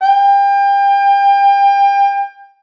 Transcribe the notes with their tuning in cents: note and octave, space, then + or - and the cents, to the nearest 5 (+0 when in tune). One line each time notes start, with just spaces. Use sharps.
G5 +30